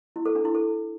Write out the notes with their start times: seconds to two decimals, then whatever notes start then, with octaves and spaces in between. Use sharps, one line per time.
0.16 E4
0.25 A4
0.35 D4
0.45 E4
0.55 A4